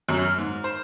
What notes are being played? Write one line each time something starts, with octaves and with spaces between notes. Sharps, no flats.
F#2
F6
G#2
C5